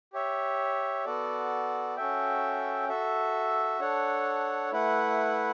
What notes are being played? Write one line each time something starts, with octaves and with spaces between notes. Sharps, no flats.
G4 C#5 E5
B3 F#4 A4 D5
C#4 F#4 A4 E5 G5
F#4 A4 E5
D4 A4 C#5 F#5
A3 E4 B4 F#5